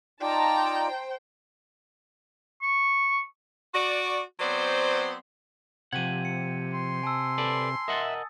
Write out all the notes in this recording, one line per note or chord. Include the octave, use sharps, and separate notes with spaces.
D#4 F4 D5 G5 A5 A#5
C5
C#6
F#4 D5
F#3 B3 C4 C5 D5
C3 F3 G4 F#5 G#6 D#7
C#7
C6
G#5 A5 E6
A4 B4 D5
A#4 D#5 E5 F#5 D#6 A6